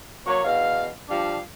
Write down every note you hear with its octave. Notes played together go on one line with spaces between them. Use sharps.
F#3 A#3 C#5
E2 B2 F5
F3 G3 D4 F5